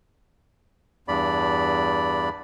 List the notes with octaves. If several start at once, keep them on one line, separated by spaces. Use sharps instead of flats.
E2 G2 D5 B5